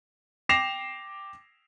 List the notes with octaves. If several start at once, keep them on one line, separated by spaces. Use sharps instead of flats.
G5 D6 A#6 C7 E7 F7